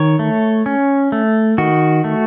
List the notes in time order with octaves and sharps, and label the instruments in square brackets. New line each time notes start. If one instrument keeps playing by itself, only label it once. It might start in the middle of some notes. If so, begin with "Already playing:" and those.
Already playing: [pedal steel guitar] D#3 C#5
A3
C#4
A3
D#3 F#4
A3